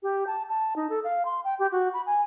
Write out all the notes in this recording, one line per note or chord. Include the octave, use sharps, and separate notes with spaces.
G4
A5
A5
D#4
A4
F5
C6
G5
G4
F#4
B5
G#5